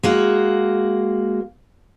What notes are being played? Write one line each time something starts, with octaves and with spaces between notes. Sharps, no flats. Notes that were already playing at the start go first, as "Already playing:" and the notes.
G#3 A#3 F#4